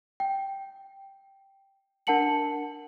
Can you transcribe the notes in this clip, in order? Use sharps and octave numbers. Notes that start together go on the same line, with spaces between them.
G5
D4 A#4 F#5 A5 C#7 F#7